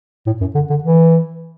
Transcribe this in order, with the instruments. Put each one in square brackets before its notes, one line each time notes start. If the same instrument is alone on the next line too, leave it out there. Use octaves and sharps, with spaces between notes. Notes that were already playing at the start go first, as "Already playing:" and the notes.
[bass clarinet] A2
F#2
D3
D3
E3